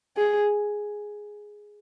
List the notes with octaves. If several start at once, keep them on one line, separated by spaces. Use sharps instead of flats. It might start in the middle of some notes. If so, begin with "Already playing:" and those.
G#4